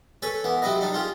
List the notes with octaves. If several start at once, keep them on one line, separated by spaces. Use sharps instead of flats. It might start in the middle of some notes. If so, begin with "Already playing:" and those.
A4 B4 C#5 G#5 B5
E3 B3
C3 F#3 C4 E4 B4 D#5
G3 D4 D#4
C4 F4 G4 G#4